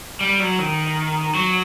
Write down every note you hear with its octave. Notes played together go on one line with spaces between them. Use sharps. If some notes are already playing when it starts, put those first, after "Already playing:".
G3
F#3
D#3
F#3